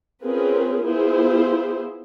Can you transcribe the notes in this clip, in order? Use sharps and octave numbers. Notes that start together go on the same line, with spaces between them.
C4 C#4 F4 G#4 A#4 B4
B3 E4 F4 G#4 C5